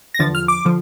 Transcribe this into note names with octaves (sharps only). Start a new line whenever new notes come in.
A#6
E2 D3 F3 A6
F6
D6
D3 F3